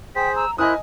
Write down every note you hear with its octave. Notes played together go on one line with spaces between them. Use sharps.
G#4 C5 G5 B6
A#5 E6
E4 A#4 C5 D#5 G#5 D#6 F#6